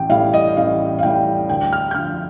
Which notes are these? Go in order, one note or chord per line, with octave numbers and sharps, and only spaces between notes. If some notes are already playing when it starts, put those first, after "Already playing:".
Already playing: A1 G5
A2 G3 F5
D#5
A1 F5
F5
A2 G3 G5
D2 G5
F6
G6
D3 F3 F6